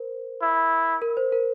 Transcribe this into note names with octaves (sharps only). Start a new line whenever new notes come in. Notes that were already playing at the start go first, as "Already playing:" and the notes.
Already playing: A#4 C5
E4
A#4
C5
A#4